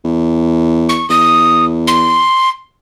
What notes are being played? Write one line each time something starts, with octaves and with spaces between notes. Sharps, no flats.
E2
C#6
E2 D#6
C6